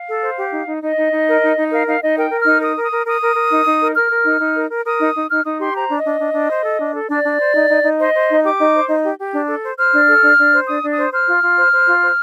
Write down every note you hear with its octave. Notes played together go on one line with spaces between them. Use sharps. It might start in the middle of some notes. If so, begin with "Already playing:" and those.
Already playing: F5
A4
C5
G4
D#4
D#4
D#4 D#5
D#4
D#4
A#4
D#4
D#4
A#4 F5
D#4 F5
D#4 D#5
A#4 G5
A#4
F6
D#4
A#4 D#6
A#4
D#6
A#4
A#4 D#6
A#4
A#4
D#4
D#4
A#4
A#4 F6
A#4
D#4
D#4
A#4
A#4
A#4 D#6
D#4
D#4
D#4 F6
D#4 D#6
G4 C6
C5 A#5
D4
D#5
D4
D4
D4
C5
A4
D4
A4
D4 D5
D4
C5
D#4
D#4
D#4
C5 D#5
C5
D#4
G4 D6
D#4
C5
D#4
G4
G4
D4
A4
C5
C5 F6
D4
A4
D4
D4
C5
D4 D#6
D4
D#6
C5
C5 F6
F4
F4
C5
C5
F4
C5